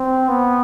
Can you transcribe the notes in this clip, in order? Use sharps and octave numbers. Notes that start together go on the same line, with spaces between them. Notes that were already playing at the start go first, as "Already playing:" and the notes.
Already playing: C4
B3